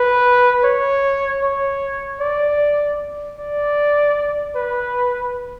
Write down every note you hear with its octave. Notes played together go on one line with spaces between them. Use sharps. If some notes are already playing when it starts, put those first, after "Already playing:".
Already playing: B4
C#5
C#5
D5
D5
B4